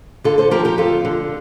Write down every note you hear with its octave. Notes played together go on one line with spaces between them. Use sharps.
D3 F4 A4
A4 C5
F3 G4 A#4
G4 A#4
F2 F4 A4
D3